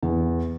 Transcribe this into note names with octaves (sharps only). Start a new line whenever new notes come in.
E2